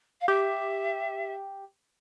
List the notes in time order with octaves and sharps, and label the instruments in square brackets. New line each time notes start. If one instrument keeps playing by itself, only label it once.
[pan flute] F5
[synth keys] G4 [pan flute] E5